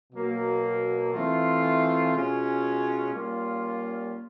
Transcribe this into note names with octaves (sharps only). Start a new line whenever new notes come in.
B2 F#3 A#3
E3 A3 C4 F4
B2 G#3 C#4 F4
G3 A#3 C#4 F4